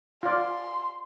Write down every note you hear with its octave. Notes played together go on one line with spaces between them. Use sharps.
F4 D5 C6